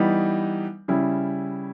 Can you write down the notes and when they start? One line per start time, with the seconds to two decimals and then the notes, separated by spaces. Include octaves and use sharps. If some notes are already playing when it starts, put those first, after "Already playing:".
Already playing: E3 G3 B3 D#4
0.88 C#3 G3 C#4 E4